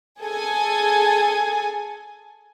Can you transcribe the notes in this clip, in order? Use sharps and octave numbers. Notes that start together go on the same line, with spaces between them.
G#4 A4 G#5